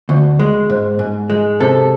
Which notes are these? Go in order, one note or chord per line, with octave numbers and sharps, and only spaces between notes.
D2
G#3
G#2
G#2
G#3
C3 A4